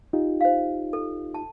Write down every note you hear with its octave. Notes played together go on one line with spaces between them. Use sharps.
D#4 F4 G4
C5 F5
A4
A5